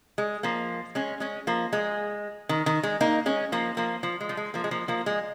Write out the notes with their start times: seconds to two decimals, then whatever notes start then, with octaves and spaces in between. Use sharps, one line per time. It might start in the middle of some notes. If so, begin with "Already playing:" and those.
0.18 G#3
0.43 F3 A#3
0.95 G#3 C#4
1.20 G#3 C#4
1.47 F3 A#3
1.73 G#3
2.49 D#3
2.66 D#3
2.83 G#3
3.01 A#3 D#4
3.26 G#3 C#4
3.52 F3 A#3
3.77 F3 A#3
4.03 F3
4.21 G#3
4.29 F3
4.37 G#3
4.54 F3 A#3
4.64 G#3
4.71 F3 A#3
4.88 F3 A#3
5.06 G#3